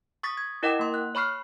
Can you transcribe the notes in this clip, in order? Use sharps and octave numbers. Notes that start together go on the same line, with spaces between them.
C#6 D#6 A6 B6
G#6
E4 A#4 D#5 F#5 G5 D6
A#3 C6
F#6
C#5 B5 C#6 F6 C7